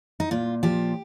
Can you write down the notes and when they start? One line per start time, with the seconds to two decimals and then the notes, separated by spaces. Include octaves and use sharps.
0.20 D#4
0.31 A#2 F4
0.63 F3 G4